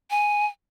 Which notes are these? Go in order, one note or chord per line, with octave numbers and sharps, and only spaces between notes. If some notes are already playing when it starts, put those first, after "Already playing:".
G#5